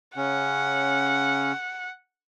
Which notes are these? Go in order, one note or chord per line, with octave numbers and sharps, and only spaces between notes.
C#3 C#4 F#5